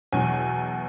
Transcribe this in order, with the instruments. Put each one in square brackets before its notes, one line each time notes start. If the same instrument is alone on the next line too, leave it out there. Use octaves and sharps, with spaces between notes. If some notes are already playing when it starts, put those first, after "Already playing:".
[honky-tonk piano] E2 B2 F#3 G#5